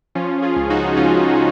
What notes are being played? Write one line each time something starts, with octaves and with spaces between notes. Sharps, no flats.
F3 C#4 F4
F4 G#4
C#2
D#4 F#4
C#2 C#4 F4